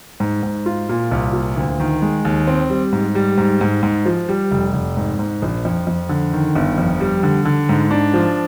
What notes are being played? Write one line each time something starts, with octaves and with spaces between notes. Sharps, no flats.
G#2
G#2
F4
A#2
C2
A#2
D2
D#3
G#3
D#2
C4
G3
G#2
G3
G#2
G#2
G#2
F3
G3
F1
F1
G#2
G#2
A#1
F2
F2
D3
D#3
G1
F2
G3
D3
D3
G#2
D4
F3